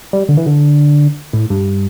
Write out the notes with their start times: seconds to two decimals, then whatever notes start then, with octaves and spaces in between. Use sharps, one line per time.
0.13 G3
0.29 D3
0.37 E3
0.46 D3
1.33 A2
1.50 G2